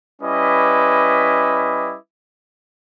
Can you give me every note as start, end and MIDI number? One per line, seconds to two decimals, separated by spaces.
0.22 1.96 55
0.22 1.96 61
0.22 1.96 64
0.22 1.96 71
0.22 1.96 75
0.22 1.96 86